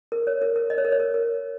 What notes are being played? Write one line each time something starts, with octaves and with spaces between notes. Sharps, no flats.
A#4
C#5
A#4
A#4
D#5
C#5
A#4
C#5
A#4
A#4